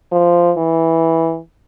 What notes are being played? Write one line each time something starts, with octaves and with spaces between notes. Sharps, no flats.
F3
E3